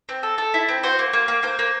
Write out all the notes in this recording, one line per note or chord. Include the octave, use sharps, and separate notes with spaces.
C4
A4
A4
E4
C4
F#4 C5
A#3
A#3
A#3
A#3 C5
A#3